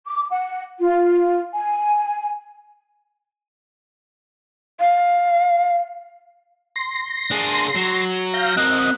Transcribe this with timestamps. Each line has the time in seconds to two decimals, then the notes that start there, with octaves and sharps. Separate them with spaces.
0.07 D6
0.31 F#5
0.79 F4
1.53 G#5
4.80 F5
6.76 C6 A#6
7.31 D4 G#4
7.75 F#3
8.34 F5 G6 A#6
8.57 C4 A#4 D#5 F#6